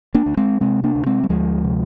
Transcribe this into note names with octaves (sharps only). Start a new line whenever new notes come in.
A#3 D4
D2
G#3 C4
C3 G#3 C4
A#3 D4
D2
G#3 C4
G3
D2 F3 G#3
C3